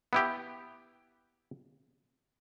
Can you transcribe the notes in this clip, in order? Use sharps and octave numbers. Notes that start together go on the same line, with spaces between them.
B3 E4 G4